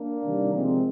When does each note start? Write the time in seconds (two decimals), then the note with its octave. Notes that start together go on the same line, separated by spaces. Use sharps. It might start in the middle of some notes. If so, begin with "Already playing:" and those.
Already playing: A#3 D4
0.23 C3 D#3 G3
0.52 C3 F3 G#3 C4